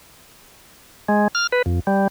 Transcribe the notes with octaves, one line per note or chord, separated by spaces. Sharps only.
G#3
F6
B4
F2
G3